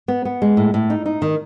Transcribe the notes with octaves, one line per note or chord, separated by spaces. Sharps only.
B3
B3
G#3
A2
A2
D#4
D#4
D#3